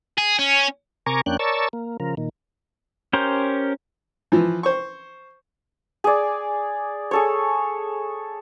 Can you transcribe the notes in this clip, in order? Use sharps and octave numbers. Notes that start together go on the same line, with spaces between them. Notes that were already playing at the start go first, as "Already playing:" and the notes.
G#4
C#4
C3 A#4 G#5 A#5 C#6 D6
F2 A#3 C#4 D4 G5 F#6
A#4 C#5 D5 A5 C#6 E6
A#3
C#3 F3 A#4
A#2 D#3
C#4 G4 A#4 C5
E3 F3
C5 C#6
G#4 D5
G#4 A4 C#5